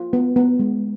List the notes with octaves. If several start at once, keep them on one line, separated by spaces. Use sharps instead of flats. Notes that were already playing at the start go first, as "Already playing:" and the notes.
Already playing: F4
B3
B3
G#3